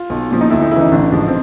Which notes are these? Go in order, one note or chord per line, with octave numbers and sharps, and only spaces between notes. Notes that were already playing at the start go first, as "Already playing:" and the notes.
Already playing: F4
B1
A#2 F3
D#4
D2 E4
D#4
C#3 E3 E4
D#4
A1 D4
G#2 F3
C4